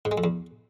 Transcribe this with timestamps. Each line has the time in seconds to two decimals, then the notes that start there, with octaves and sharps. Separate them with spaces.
0.05 G#2
0.11 G#3
0.18 F2
0.24 E2